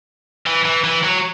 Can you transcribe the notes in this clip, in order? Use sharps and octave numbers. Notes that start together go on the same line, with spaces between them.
E3
E3
E3
F#3